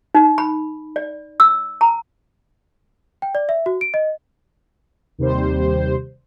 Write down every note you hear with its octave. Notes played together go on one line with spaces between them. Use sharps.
D#4
B5
D5
E6
A#5
G5
D5
E5
F#4
D7
D#5
D#2 C3 G3 C5